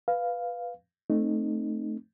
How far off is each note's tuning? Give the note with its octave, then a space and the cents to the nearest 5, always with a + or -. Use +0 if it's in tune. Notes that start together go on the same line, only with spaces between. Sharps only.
B4 +0 F5 +0
A3 +0 C4 +0 D#4 -20